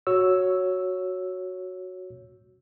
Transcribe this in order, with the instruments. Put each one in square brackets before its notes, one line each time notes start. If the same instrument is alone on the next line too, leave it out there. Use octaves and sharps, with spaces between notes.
[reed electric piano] F#4 C#5 E6